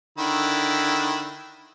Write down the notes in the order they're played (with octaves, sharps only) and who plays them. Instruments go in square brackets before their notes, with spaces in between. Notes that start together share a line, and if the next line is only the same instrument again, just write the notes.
[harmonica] D3 D#3 E4